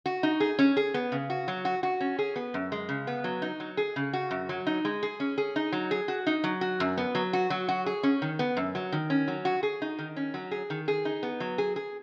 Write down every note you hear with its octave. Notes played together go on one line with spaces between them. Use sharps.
F#4
D#4
G#4
C#4
G#4
B3
C#3
F#4
F#3
F#4
F#4
C#4
G#4
B3
F#2
G#3
C#3
B3
F#3
D#4
F#3
G#4
C#3
F#4
F#2
F#3
D#4
G#3
G#4
C#4
G#4
D#4
F#3
G#4
F#4
D#4
F#3
F#4
F#2
B3
F#3
F#4
F#3
F#4
G#4
C#4
D#3
B3
F#2
F#3
D#3
C#4
F#3
F#4
G#4
D#4
D#3
C#4
F#3
G#4
D#3
G#4
D#4
B3
F#3
G#4
G#4